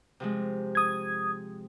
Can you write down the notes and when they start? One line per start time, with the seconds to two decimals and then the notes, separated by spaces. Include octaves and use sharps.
0.20 C3 F3 G#3
0.75 D#6 G#6